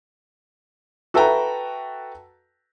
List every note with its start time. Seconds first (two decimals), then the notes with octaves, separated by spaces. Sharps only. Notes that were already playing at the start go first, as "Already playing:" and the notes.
1.14 F#4 A4 B4 E5 G5 A#5